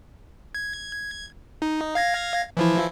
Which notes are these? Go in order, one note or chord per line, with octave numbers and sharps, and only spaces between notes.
G#6
D#4
F5 G#6 A#6
E3 F3 E4